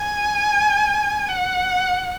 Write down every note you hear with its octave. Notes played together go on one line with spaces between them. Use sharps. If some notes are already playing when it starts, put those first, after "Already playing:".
Already playing: G#5
F#5